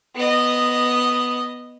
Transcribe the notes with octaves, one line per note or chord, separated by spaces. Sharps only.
B3 D#5